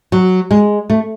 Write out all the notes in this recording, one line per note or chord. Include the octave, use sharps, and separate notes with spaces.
F#3
G#3
A3